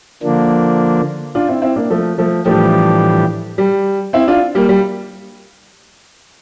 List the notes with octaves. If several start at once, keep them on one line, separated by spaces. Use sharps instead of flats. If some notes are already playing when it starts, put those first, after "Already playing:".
D3 F3 A#3 D4
D4 F4
C4 E4
C4 E4
A#3 D4
F3 A3
F3 A3
A2 E3 F3 G3 A3 D4 G4
G3
C4 E4
D4 F4
G3 A#3
G3